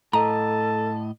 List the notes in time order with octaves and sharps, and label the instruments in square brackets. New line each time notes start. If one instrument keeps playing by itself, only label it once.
[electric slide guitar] A2 D#5 [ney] A4 [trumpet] A5 [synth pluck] A#5